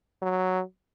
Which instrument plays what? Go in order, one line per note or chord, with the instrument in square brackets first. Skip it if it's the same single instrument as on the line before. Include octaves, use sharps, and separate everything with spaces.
[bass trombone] F#3